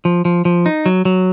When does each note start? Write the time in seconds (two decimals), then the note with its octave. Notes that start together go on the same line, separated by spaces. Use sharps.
0.05 F3
0.25 F3
0.45 F3
0.66 D#4
0.86 F#3
1.05 F#3